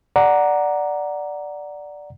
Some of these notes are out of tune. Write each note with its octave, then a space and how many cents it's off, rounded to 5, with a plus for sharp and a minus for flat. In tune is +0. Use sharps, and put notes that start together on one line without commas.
D5 +0 F#5 +0 A#5 +0